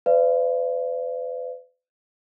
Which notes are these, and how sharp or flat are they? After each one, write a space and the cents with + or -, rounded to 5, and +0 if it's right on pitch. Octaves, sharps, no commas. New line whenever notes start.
B4 +40 D5 +0 F5 -45